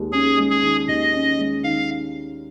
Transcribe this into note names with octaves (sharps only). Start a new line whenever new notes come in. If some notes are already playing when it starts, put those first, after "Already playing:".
Already playing: D#2 D#3 G#3
C#4 G#4
G#3
G#4
D#3
D#2 D#5
C#4
G#3
D#3 F5